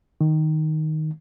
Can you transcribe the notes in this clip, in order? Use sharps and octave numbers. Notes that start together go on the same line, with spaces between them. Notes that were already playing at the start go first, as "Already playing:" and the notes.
D#3